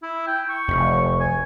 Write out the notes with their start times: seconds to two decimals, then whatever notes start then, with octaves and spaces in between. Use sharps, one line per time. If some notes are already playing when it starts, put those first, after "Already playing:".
0.02 E4
0.27 G5
0.49 C#6
0.68 F1
1.20 G#5